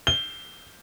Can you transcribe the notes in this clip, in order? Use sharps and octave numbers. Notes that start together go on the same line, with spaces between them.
G7